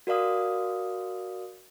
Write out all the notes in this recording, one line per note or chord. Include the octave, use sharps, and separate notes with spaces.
F#4 A#4 D5 F5 D#6